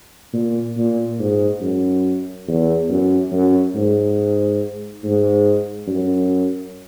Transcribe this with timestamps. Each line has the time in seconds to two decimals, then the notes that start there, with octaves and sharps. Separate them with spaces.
0.33 A#2
0.77 A#2
1.19 G#2
1.61 F#2
2.48 E2
2.89 F#2
3.32 F#2
3.75 G#2
5.03 G#2
5.87 F#2